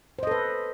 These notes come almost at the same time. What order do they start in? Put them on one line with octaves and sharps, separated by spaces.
C5 D#5 A4 B4